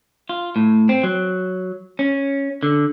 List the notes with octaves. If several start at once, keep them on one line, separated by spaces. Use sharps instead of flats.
F4
A2
C4
F#3
C#4
D3